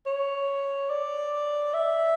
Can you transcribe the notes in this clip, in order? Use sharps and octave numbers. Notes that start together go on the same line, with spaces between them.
C#5
D5
E5